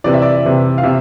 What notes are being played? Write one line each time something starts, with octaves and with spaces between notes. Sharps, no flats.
C3 E3 D5
E5
D5
C3 E3
F5
C3 E5